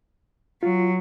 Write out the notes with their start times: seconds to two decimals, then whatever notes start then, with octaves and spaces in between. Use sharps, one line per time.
0.63 F#3 F4